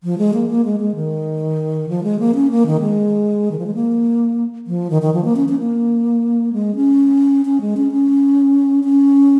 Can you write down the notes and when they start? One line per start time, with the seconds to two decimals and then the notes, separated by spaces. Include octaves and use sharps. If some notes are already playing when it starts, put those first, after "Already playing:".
0.04 F3
0.18 G#3
0.34 A#3
0.50 A#3
0.65 G#3
0.80 G#3
0.95 D#3
1.89 F3
2.03 G#3
2.19 A#3
2.35 C#4
2.51 A#3
2.66 D#3
2.81 G#3
3.51 D#3
3.59 F3
3.66 G#3
3.74 A#3
4.67 F3
4.90 D#3
5.02 D#3
5.14 F3
5.25 A#3
5.36 C#4
5.49 C#4
5.59 A#3
6.53 G#3
6.76 C#4
7.45 C#4
7.61 G#3
7.77 C#4
7.92 C#4
8.84 C#4